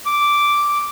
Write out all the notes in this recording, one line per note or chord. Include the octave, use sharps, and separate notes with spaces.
D6